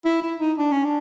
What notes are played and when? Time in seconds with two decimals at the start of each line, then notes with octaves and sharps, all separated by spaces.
0.05 E4
0.22 E4
0.40 D#4
0.58 D4
0.72 C#4
0.84 D4